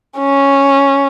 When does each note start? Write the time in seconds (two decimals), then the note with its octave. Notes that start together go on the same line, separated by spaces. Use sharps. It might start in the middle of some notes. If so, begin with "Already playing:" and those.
0.18 C#4